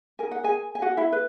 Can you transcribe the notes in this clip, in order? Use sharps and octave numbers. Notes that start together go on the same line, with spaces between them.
D#4 A#4 G#5
F#5
G#4 G#5
G#5
F#4 F#5
E4 E5
B4